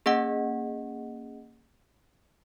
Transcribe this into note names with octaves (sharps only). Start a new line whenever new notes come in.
A#3 C#4 G#4 D#5 F#5